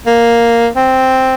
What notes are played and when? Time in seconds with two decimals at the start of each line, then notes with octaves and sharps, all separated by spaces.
0.07 A#3
0.76 C4